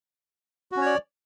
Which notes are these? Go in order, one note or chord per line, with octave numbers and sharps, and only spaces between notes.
C#4 F#4 C#5 D5